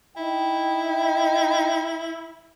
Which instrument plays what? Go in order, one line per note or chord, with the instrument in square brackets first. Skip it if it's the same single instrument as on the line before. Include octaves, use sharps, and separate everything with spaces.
[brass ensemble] D#4 D#5 G5 [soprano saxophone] E4